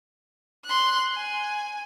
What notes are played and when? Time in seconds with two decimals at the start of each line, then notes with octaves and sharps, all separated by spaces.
0.65 C6 F#6
1.14 G#5